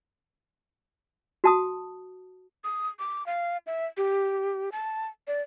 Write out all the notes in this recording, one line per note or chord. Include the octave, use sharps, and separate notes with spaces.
F#4 A5 D#6
D#6
D6
F5
E5
G4
A5
D5